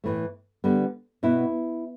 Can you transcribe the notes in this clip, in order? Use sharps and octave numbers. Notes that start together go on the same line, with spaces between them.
A2 E3 A3
D3 G3 B3
B2 B3 E4